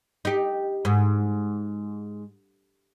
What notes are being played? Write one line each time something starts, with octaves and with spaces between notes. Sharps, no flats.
D#4 G4
G#2